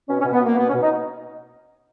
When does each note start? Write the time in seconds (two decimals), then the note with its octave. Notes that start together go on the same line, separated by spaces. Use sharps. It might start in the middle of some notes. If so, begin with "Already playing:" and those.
0.08 B2 C#4
0.20 C#4
0.25 B2
0.33 B3
0.40 B2 A#3
0.56 B2 B3
0.69 C#4
0.74 B2
0.81 D#4